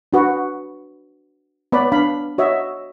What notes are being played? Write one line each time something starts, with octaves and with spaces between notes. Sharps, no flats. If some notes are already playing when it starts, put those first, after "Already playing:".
D4 F#4 B4
B3 B4 C#5 D5 B5
D4 F5 B5
F#4 C#5 D#5 E5